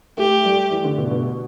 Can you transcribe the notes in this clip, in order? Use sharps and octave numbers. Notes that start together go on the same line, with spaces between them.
A3 G4
G3
E3
D3
B2
B2